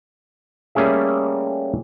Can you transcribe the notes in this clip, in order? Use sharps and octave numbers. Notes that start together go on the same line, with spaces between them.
G3 A3 A#3 C#4 G#4 E5